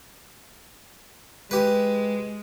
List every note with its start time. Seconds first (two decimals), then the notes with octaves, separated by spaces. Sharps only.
1.51 G#3 G4 B4